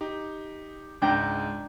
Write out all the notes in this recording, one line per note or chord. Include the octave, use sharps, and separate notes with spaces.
D#4 G4
C#2 G#2 D4 G5 A#5